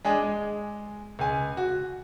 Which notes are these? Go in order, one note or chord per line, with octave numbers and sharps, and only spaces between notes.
G#3 D4 G#4
G#3
C#2 G#5
F#4